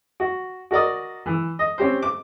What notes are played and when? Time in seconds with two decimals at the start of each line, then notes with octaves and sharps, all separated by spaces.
0.20 F#4
0.71 F#4 A#4 D5 D#5
1.26 E3
1.59 D#5
1.78 C4 C#4 G4 C5
2.02 D6